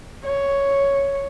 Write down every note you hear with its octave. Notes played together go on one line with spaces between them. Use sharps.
C#5